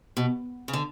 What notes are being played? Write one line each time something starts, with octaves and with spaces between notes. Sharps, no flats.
B2
C#3
D3